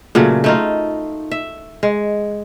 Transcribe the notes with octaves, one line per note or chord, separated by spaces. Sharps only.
A#2 C#3 F#3 A3
A3 D#4 F4
E5
G#3